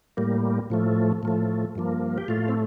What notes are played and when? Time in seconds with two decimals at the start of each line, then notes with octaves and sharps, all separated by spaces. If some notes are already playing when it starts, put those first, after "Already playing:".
0.17 A2 G3 A#3
0.70 A2 F3 A3
1.23 A2 F3 A3
1.75 G2 F3 A#3
2.18 G4
2.28 A2 A3 F4
2.48 C4